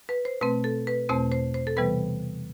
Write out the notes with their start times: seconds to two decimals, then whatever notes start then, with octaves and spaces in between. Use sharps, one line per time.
0.09 B4
0.25 C5
0.41 B2 A3 C4 B4
0.64 A4
0.87 B4
1.09 E2 B2 A3 C4 C5
1.32 C5
1.54 C5
1.67 A4
1.77 C3 E3 G3 B3 B4